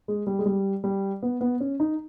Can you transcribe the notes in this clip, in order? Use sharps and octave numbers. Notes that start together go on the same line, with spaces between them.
G#3
G3
G#3
G3
G3
B3
B3
C#4
D#4